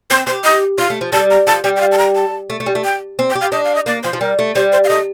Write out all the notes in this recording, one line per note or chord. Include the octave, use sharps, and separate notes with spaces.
C4 C5
G4 C5
D#5
F4 F5
A3
F3
G3 A5
A#5
F3 A5
G3 G5
G5
F5
A5
A#5
A5
A3
A3
G3
A3
G5
C4
G5
G4
F5
D4 D#5
F5
D#5
A#3 D5
F3 C5
F3
G3 A#4
A3
G3 C5
C5
F5
A3 D#5